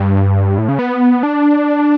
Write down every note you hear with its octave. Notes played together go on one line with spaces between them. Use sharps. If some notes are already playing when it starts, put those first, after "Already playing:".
Already playing: G2
A2
C#3
B3
D4